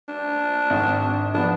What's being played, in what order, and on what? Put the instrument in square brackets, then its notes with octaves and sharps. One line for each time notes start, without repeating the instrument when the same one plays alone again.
[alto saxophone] D4
[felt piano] G#1
[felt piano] F3 B3 [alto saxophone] D4